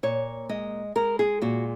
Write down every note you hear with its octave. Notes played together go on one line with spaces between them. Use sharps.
A#2 C#5
G#3 D#5
G#3 A#4
G#4
A#2 F#4